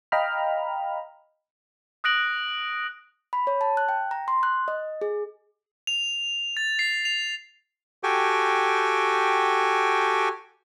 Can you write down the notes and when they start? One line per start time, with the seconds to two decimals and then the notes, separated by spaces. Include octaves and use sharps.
0.12 D#5 F5 G5 A#5 B5 F6
2.04 D#6 F#6 A#6 D7 F#7
3.33 B5
3.47 C#5
3.61 A5
3.77 F#6
3.89 G5
4.11 A#5
4.28 C6
4.43 F#6
4.68 D#5
5.01 G#4
5.87 F7
6.57 A6
6.79 C7
7.05 F7
8.03 F#4 G4 A4 G5 G#5